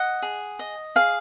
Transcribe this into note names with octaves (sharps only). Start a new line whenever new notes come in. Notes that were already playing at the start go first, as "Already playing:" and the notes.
Already playing: D#5 F#5
G#4
D#5
G#4 F5